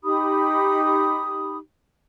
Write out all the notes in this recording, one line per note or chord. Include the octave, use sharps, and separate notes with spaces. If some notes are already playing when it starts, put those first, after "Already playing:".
D#4 G4 B5 D#6